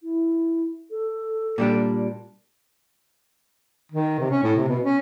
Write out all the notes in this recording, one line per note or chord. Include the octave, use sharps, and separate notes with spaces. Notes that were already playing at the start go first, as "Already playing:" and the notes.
E4
A4
A#2 G3 D4
D#3
C3
C#4
A2
C3
B2
C#4